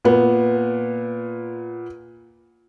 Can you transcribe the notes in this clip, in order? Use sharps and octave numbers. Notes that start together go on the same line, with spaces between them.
A#2 B3